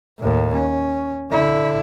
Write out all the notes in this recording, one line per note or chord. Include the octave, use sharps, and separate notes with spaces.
D#2 A2
C#4
D3 E4